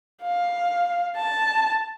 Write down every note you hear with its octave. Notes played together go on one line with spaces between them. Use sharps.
F5
A5